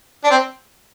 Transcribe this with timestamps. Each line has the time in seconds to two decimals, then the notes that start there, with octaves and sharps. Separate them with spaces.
0.24 D4
0.30 C4